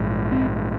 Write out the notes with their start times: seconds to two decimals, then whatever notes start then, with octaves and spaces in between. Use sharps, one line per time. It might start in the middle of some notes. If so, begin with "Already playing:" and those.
Already playing: A#1 G#2
0.32 C4